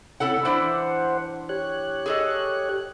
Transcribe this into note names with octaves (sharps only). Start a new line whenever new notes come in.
C3 C#4 E4 A4 F#5
E3 D4 E4 C5 F#5
G4 C#5 F#6
G#4 A4 D#5